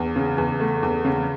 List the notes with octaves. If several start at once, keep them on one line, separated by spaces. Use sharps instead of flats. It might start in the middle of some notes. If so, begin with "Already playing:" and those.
Already playing: E2
C#3
E2
A3
E2
C#3